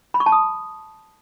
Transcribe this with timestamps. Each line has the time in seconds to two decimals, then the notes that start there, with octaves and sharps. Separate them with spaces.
0.14 B5
0.20 C#6
0.26 A5
0.32 D#6